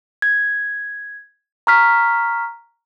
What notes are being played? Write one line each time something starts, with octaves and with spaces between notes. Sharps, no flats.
G#6
A#5 C#6 F6 B6